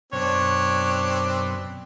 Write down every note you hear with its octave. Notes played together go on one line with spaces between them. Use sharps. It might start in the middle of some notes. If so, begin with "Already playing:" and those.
F#2 B2 C4 D4 C#5